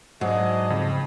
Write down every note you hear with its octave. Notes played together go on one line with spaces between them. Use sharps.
G#2 F#3 D4 G#4 D#5
F2 C#3